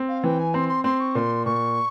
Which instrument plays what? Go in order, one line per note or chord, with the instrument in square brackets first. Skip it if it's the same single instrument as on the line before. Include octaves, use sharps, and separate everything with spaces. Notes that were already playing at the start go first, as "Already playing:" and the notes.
Already playing: [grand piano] C4
[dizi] F5
[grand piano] E3 [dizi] G5
[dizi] G#5
[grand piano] C4 [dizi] C6
[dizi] C6
[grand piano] C4 [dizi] C6
[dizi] C#6
[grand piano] A#2 [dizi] C6
[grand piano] A#2 [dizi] C#6